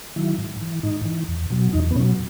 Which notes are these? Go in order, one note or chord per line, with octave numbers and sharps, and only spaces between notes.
D#3 F#3 E4
G#2
E3
G#2 D#4
E3
E2
B2 F#3
E2 D#4
B3
B2 F#3 C#4